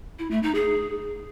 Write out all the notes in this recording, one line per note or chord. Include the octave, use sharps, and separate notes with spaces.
E4
A3
D#4
G#4